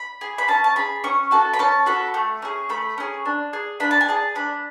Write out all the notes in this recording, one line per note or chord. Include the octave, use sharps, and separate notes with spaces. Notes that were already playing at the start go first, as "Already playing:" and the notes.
Already playing: B5
G#4
B5
C#4 A5
A5
G#4 B5
C#4 C#6
F#4 A4 A5
B5
C#4 A5
F#4 A4 B5
A3
C#4 G#4
A3 B5
C#4 G#4
D4
G#4
D4 B5
A5
G#5
G#4 A5
D4 B5